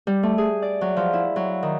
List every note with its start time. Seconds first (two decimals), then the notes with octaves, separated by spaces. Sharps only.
0.07 G3
0.23 A3
0.38 G#4
0.62 D5
0.81 F#3
0.97 F3
1.13 E4
1.36 F#3
1.63 D#3